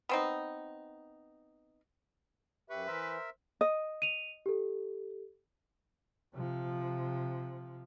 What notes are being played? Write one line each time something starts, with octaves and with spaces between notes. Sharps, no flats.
B3 C4 D#4
F#2 G4 B4 E5 C#6
E3 A#4 C5 E5
D#5
D#7 F7
G4 A4
C3 F3